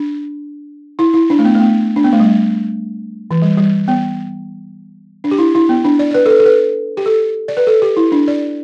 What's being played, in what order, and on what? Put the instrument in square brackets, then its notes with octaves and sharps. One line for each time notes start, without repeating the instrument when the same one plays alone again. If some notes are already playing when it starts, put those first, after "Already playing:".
Already playing: [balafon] D4
E4
E4
D4
A3
B3
A3
B3
D4
B3
A3
G3
E3
G3
G3
B3
D4
G4
E4
E4
B3
D4
D5
D5
B4
A4
B4
A4
B4
G4
A4
D5
B4
A4
G4
E4
D4
D5